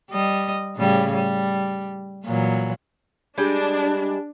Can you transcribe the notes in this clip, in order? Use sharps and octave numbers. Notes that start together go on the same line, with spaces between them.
G3 D#5
A2 C#3 G3
G3
A#2 E3 F#3
G3 G#3 D4 G5